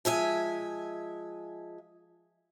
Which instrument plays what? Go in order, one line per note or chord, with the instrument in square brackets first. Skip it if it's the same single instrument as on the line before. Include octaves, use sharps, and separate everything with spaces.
[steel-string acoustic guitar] F3 G#3 E5 G#5